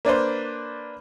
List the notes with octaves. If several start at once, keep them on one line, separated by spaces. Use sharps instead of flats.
A#3 D4 B4 C5